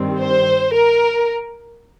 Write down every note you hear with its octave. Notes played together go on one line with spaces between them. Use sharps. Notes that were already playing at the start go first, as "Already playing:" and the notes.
Already playing: G2 D#3 G3 C4
C5
A#4